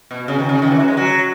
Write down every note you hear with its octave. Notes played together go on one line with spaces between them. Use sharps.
B2
C#3
D#3
C#3
D#3
E3
F#3
G#3
F#3